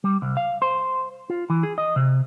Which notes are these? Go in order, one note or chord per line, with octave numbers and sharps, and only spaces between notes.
G3
C2
F5
C5
F4
E3
G#4
D#5
C3